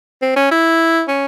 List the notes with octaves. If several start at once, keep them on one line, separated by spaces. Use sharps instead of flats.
C4
C#4
E4
C#4